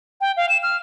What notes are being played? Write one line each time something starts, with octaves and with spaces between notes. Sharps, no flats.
G5
F5
E7
F6